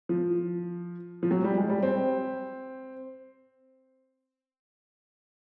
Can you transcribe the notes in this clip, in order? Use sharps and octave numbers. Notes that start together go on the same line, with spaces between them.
F3
F3
F#3
G3
G#3
G3
C4